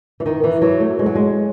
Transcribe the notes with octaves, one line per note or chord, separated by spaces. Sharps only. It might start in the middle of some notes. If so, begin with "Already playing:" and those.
E3
D#3
E3
F#3
A3
G#3
F#3
G#3